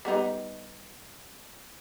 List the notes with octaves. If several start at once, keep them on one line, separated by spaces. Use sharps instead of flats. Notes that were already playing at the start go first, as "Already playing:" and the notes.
G3 B3 D#4